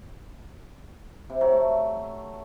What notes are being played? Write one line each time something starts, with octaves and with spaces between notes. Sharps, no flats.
C3
F#3
A3